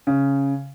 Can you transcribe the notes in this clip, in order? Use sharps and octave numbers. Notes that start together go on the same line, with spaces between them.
C#3